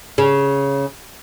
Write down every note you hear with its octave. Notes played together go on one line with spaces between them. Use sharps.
C#3